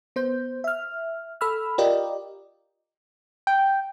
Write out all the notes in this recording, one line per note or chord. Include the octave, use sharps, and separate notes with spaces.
B3 C5 G6
E5 F6
A4 B5 E6 F6
F4 G4 A#4 D5 D#5 G5
G5